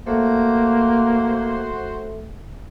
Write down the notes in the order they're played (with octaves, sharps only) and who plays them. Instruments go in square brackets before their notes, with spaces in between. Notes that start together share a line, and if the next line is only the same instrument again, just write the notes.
[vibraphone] A3 A4 E5 [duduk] A#3 [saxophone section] F#4 C5